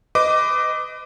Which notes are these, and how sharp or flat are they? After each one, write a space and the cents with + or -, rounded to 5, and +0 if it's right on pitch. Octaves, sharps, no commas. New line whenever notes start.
B4 +35 D#5 +0 D6 +0